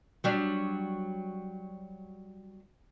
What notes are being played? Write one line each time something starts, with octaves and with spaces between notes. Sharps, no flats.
F#3 G3 D4